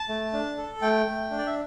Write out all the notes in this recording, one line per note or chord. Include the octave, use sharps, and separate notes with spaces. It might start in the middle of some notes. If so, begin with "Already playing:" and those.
Already playing: A5
A3
D4
A4
A3 G5
A3
D4
D5
E5